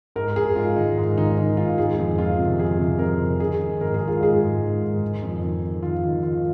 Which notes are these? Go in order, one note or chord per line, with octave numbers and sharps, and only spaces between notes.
G#2 A#4
G#2 G#4
G#2 F4
D#3 D#4
G#2
D#3 D#4
D#3
G#2 F4
D#3 G#4
F2
D#3 F4
C3
F2 G#4
C3
F2 A#4
C3
D#3 G#4
D#3
G#2 A#4
G#4
G#2
F4
G#2 G#4
G#2
D#3
G#2
D#3
F2
D#3
D#3
D#3 F4
D#3
D#3 F4